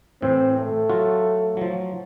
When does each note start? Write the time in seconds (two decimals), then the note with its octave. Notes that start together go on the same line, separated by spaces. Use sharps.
0.22 A2 E3 C4
0.58 A3
0.89 F#3 F4 F#4
1.57 F3 F#3